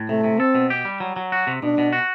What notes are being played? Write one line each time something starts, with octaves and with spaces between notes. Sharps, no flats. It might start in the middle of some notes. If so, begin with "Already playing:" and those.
Already playing: A2
C3 A3
C3
C4 A4
B2
G4
G3
F#3
F#3
F#4
C3
B2 D4
B2
F#4